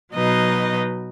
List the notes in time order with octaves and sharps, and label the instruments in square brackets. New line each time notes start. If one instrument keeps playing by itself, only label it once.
[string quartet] B2 F#3 D#4 B4 D#5